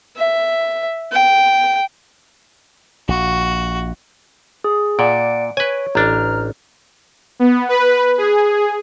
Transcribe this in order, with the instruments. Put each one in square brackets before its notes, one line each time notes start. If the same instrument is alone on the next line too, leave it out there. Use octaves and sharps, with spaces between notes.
[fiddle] E5
G5
[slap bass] A#1 [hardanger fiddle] F#4
[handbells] G#4
[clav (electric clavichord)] A#2 [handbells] D5 F#5 D7
[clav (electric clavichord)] B4 G#5 [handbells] C#5
[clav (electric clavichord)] A1 D4 [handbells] A#5 F6
[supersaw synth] B3
B4
G#4